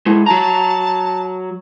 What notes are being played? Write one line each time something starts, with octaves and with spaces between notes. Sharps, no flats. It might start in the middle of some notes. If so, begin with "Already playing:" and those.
G#3 E4
F#3 A5 A#5